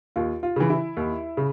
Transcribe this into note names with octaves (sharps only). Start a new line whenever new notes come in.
D#2 F4
F4
C#3 E3
E4
D#2
C#3